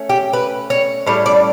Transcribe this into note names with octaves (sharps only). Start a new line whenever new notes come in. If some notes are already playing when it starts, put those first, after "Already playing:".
Already playing: A3 C#4
G4
B4
C#5
A2 G3 C#4 C#5
D5